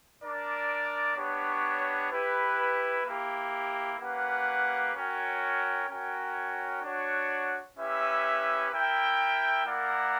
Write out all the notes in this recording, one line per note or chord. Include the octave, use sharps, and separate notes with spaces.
D4 A#4 D5
B3 D4 G4 C#5
E4 G4 B4
A#3 E4 G4
A#3 C#4 G4 B4 F#5
C#4 F#4 A#4 C#5 G5
C#4 F#4 A#4 C#5 G5
D4 F#4 C#5 F#5
C#4 E4 G4 B4 E5
E4 A#4 E5 G5
A#3 E4 A#4 D5 F#5